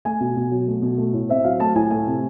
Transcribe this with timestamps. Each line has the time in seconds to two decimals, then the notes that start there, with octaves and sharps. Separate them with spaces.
0.05 A3 G#5
0.20 B2
0.37 B2
0.51 F#3
0.67 A3
0.82 B2
0.98 A3
1.13 A2
1.29 C4 E5
1.44 F#3 F5
1.60 A3 A5
1.75 A2 G#5
1.91 A3 G#5
2.07 C3